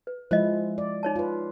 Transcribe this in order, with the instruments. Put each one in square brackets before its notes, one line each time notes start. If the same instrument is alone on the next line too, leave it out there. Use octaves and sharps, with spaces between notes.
[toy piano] B4
[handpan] F3 G#3 E4 [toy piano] C5 D#5
[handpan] D5
[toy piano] D#4 C#5 A5
[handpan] F4 B4